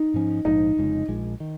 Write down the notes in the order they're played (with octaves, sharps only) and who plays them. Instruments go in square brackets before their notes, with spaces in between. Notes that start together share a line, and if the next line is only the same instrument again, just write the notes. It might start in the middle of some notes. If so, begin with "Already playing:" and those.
Already playing: [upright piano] D#4
[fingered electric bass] G#2 F3 C#4
[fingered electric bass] A#1 G#2 F3 [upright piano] D#4
[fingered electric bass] F1 F2 C#3 G#3
A#1 A#2 G#3
D#3